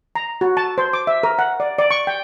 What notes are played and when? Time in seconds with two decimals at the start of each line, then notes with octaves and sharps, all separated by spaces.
0.15 A#5
0.41 F#4
0.57 A5
0.78 C5
0.93 D6
1.07 E5
1.23 A#4
1.39 F#5
1.60 D5
1.78 D5
1.91 C#6
2.07 G5